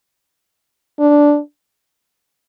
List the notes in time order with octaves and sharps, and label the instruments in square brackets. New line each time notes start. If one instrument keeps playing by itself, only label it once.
[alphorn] D4